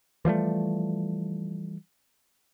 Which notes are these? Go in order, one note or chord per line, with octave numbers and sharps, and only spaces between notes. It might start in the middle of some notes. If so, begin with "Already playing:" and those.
E3 F3 G3 A3